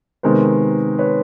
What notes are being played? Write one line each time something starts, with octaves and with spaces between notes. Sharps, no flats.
C3 D#3 G#3 B3 A#4 C5
B4 C#5